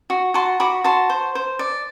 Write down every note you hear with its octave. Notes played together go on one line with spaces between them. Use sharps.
F#4
F#4 A5 C6
F#4 B5 D6
F#4 A5 C6
C5
C5
D5